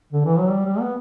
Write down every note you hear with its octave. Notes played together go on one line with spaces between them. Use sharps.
D3
E3
F#3
G3
G3
B3